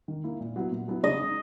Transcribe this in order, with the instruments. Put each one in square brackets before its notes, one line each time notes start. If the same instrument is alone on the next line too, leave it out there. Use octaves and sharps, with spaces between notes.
[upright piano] D#3
A#3 E4
A#2
F#3 B3 E4
A#2
F#3 B3 E4
[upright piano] C#3 [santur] D#5
[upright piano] G#3 D#4